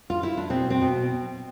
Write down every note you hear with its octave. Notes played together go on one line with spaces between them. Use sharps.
F4
E4
D4
B2 C4
C4
B2